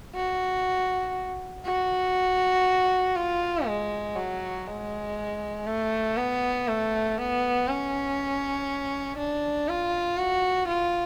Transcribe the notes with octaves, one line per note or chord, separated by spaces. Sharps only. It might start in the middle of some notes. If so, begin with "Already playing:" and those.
F#4
F#4
F4
G#3
F#3
G#3
A3
B3
A3
B3
C#4
D4
F4
F#4
F4